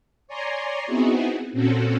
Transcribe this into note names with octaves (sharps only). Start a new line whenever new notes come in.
C#5 D5 G#5 A#5 C6
B3 C4 D#4 E4 F#4 G#4
A#2 C4 C#4 F#4 A4